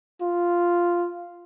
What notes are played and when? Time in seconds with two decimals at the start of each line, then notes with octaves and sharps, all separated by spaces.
0.21 F4